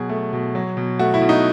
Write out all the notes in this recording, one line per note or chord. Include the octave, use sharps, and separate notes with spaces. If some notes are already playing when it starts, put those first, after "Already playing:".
Already playing: B2 F#3 G#4
A3
B2
F#3
B2
A3 F#4
E4
B2
D#4